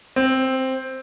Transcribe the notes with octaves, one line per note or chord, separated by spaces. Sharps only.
C4